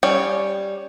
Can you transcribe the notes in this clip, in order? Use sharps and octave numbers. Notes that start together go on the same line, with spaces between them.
G3 C#4 C#5